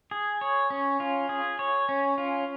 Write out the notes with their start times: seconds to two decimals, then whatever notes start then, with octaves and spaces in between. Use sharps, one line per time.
0.11 G#4
0.41 C#5
0.70 C#4
1.00 F4
1.29 G#4
1.59 C#5
1.89 C#4
2.18 F4